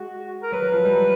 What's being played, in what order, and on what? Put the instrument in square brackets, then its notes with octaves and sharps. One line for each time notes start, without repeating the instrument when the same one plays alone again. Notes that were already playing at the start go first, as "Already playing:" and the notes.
Already playing: [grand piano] G#3 [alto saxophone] F#4
[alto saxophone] A#4
[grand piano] F#3 [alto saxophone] B4
[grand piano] F#3
F3
G3
F#3